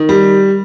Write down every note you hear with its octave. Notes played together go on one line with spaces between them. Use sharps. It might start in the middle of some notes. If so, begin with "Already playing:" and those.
Already playing: D#3
G3